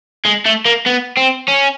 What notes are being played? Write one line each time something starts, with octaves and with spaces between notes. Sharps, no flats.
G#3
A3
A#3
B3
C4
C#4